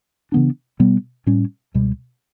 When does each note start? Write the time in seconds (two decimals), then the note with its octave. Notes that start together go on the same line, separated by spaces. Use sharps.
0.32 C#3 E3 B3 D4
0.79 B2 G3 B3
1.27 A2 G3 C#4
1.74 C#2 B2 G3